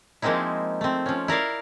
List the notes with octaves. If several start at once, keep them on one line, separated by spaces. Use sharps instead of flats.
F3 G#3 A#3 C4 D#4 E4
A3 C4
F3 C#4
E4 A#4 D5 F5